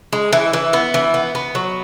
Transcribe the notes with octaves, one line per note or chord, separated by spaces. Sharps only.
G#3
E3
E3
B3
E3
B3
B3
F#3